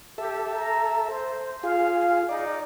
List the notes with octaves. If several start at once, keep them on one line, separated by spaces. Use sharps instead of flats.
G4 A4 E5
A#5
C5
F4 G#4 F5
D#4 D5